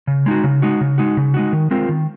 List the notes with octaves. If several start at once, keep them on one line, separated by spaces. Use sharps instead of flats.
C#3
G#3 D#4 F#4
C#3
G#3 D#4 F#4
C#3
G#3 D#4 F#4
C#3
G#3 D#4 F#4
D#3
G#3 C4 F4 A#4
D#3